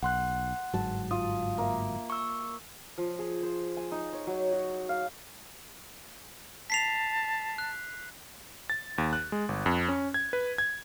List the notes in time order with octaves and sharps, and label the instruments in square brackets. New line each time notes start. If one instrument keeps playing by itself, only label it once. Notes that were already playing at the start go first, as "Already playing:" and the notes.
[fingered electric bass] B1 [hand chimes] F#5 C6 F#6
[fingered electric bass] G1 G#2 F#3 [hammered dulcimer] A5
[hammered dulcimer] F4 [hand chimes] D#6
[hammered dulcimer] A#3 E5
[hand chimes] C#6 E6
[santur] F3
G#4
C5
G#5
D#4
C#5
F#3
F#4
F5
[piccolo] A5 [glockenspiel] B6 C7 F7
[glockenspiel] F#6
[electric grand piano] A6
D#2
F#6
G#3
G1
F2
C#4
G#6
B4
G#6